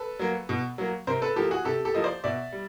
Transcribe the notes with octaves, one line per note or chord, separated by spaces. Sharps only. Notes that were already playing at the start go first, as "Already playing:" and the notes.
Already playing: A4 B4
F#3 A#3
B2
F#3 A#3
C3 A#4 C5
A4 B4
F3 A#3 G4 A4
F#4 G#4
C3 G4 A4
G4 A4
F3 A#3 D#5
C5 D5
B2 D5 E5
G3